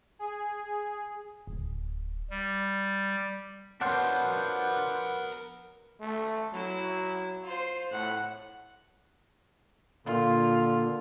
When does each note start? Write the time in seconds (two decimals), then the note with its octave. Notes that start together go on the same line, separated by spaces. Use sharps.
0.19 G#4
1.47 D1
2.31 G3
3.81 B3 D4 F4 A#4 C5 C#5 F#5
6.01 A3
6.53 F#3 E4
7.43 F4 C5
7.91 A2 F#5 F#6
10.06 A#2 D3 F4